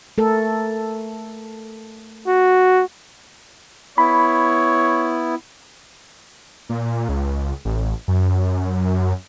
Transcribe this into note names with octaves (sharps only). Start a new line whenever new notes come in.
A3 A4 A#4
F#4
B3 E4 C#5 B5
A#2
C#2
A1
F#2